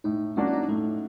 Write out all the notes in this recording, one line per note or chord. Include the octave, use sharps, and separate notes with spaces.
A2 D#4
F#3 A#3 C#4 D4 F#4
E4
D#4
A2 A3